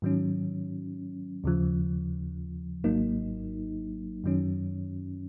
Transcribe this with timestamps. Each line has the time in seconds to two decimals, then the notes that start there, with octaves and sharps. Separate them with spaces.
0.02 G#2 D#3 F#3 C#4
1.44 D#2 C#3 F3
2.84 G#1 G#2 F#3 A#3 D#4
4.24 F#2 D#3 F#3 C#4